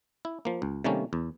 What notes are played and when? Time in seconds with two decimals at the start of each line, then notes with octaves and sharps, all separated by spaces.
0.25 E4
0.45 F3 A#3
0.62 C#2
0.84 C3 D#3 G3 A3 A#3 C#4
1.13 E2